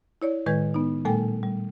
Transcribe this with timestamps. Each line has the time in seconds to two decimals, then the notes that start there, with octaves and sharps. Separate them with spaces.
0.22 E4 C#5 D5
0.46 A2 D#3 G#3 B4 G6 G#6
0.74 B3 D#4
1.05 A#2 G3 A3 A4 G5 G#5
1.43 G3